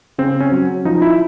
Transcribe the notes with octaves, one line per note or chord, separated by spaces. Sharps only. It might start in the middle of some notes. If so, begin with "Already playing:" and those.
C#3 C4
C#4
F#3
F3 D#4
E4